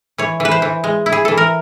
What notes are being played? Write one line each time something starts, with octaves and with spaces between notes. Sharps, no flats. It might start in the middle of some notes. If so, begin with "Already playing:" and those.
E3 C#5
E3 B4
C5
E3
G#3
E4
G#4
E3 A4
A#4